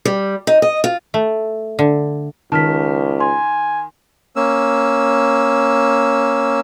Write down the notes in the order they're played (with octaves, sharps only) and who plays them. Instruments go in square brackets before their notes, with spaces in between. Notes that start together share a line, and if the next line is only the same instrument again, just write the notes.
[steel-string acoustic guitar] G3
D#4
D#5
F4
[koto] A3
D3
[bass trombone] C#2 [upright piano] D#3 [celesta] A5 F6 B6
[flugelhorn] G#5 [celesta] C6
[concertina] A#3 C#4 E6